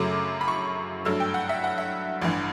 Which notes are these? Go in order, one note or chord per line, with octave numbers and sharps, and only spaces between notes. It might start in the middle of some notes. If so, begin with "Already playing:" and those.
Already playing: F#2 C#3 F#3 A3 D6
B5
C#6
G2 F#3 A3 E6
G5
F#5
E5
F#5
E5
A1 G2 E3